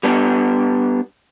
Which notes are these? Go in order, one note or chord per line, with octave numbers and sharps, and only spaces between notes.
G3 B3 D4